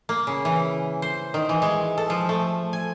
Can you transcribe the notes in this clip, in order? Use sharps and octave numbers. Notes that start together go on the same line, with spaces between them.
A#3
C#3
E3
C5
D#3
E3
G#3
A4
F3
A3
G#5